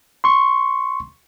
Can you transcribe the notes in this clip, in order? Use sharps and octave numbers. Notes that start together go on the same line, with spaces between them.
C6 C#6